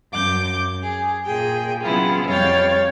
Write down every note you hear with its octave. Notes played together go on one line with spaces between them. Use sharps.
F#2 D6 G6
G#4
A#2 G#4 G5
C#3 F#3 B3 E4 F4 G#4
F2 G3 C#5 F5 G5 A6